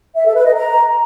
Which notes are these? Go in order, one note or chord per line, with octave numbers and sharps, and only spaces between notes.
E5
A4
B4
D#5
A#5